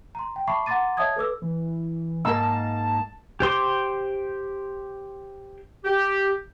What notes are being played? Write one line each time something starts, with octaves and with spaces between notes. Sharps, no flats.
A#5 C6
G5
E5 A5 B5 C#6 D6 C7
F#5 A#5 C6 D6 A6 D#7
C#5 D#5 E5 A5 D#6 G#6
A4 B4 D6 E6
E3
G#2 A#3 D#4 A#4 A5 E6
G4 C5 C6 D6
G4